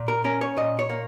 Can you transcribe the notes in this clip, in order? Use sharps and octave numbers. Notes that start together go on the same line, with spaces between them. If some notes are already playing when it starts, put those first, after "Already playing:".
Already playing: A#2
A#4
C#4 A#4
C#5
A#2 D#5
C#5
A#3